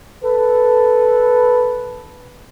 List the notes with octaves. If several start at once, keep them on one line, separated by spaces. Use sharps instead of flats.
A4 B4